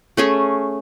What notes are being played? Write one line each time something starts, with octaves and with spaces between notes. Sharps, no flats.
A3 C#4 G#4